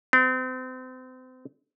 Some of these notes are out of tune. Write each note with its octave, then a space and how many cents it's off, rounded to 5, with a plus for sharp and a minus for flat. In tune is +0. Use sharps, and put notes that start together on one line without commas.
C4 -35